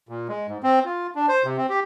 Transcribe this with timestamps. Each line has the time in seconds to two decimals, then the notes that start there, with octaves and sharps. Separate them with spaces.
0.09 A#2
0.29 G#3
0.48 G#2
0.63 C4
0.85 F4
1.15 D4
1.28 C5
1.44 C3
1.57 C4
1.69 G4